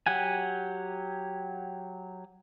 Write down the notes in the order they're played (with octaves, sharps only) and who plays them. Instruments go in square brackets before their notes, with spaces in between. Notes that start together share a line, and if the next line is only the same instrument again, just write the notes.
[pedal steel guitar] F#3 G4 F#5 G#5